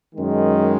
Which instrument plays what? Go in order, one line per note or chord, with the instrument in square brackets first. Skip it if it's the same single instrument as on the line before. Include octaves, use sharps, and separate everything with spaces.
[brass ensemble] F#2 D#3 G#3